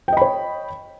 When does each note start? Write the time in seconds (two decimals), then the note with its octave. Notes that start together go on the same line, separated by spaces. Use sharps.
0.08 G5
0.13 D#5
0.17 B5
0.21 C#5